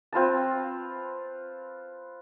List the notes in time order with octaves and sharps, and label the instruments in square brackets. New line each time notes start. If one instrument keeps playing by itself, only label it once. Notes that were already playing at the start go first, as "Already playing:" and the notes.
[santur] C4 F4 B4 A5